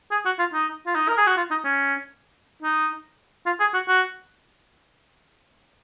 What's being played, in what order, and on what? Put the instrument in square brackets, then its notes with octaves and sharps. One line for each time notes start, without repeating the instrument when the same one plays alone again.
[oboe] G#4
F#4
F4
D#4
F4
D#4
A#4
G#4
F#4
F4
D#4
C#4
D#4
F4
G#4
F#4
F#4